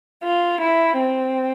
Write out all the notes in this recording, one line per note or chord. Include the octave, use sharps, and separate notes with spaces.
F4
E4
C4